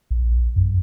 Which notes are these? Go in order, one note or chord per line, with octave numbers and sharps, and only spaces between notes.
A#1
F#2